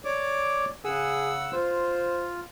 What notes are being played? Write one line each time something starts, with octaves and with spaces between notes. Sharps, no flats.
C#5 D5 D6
C#3 G#4 F#5 E6
F4 C5